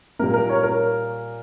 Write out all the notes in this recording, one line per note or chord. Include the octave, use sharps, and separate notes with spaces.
A#2 G3 A#3 A#4
A#4
C#5
A#4